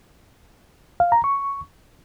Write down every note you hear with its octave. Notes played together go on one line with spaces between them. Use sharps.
F5
A#5
C#6